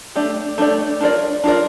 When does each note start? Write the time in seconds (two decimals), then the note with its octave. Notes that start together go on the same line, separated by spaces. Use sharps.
0.15 A3 D4 G4 D5
0.58 A3 D4 G4 D5
1.00 D4 F4 A#4 D5
1.44 D4 F4 A#4 D5